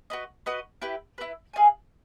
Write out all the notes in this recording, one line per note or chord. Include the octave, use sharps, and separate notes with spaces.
F#4 B4 D#5
F#4 B4 D#5
E4 G4 B4
E4 G4 B4
G#4 C#5 F5 G#5